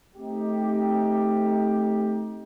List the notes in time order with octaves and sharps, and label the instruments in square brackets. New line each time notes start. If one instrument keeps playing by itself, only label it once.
[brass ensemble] A3 C4 D#4 G4